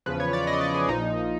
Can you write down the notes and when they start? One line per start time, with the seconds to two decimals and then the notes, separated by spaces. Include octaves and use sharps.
0.06 E2 C#3 F3 B4
0.20 C#5
0.33 D5
0.47 D#5
0.61 D5
0.74 G#4
0.87 A#1 A#2 F3 D#4